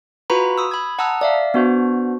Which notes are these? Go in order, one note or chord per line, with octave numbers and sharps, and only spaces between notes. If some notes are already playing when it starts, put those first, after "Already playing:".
F4 F#4 B4 A#5 B5
D#6 E6
B5 G#6
F#5 A5 A#5 D#6 E6 F#6
D5 E5 F5
B3 D4 F#4 C5